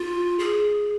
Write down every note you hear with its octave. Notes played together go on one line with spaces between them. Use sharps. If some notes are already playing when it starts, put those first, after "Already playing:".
Already playing: F4
G#4